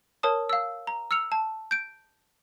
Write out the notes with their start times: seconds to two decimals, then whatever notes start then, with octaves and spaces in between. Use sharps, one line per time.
0.23 A#4 C#5 A5 D#6
0.49 F5 E6
0.87 A#5
1.11 E6 F6 C#7 F7
1.32 A5
1.71 G6 D7